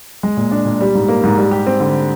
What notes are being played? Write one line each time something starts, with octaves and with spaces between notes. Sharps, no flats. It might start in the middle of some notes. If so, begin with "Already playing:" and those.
G#3
A#2
D4
A#2
G3
G#2
A#3
G#2
G3
G4
C4
D3